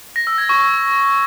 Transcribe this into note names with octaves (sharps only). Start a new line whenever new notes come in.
A#6
E6
G#6
C#6